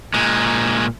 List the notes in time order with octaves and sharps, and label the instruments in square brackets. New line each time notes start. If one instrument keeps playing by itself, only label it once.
[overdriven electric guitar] A#2 G#3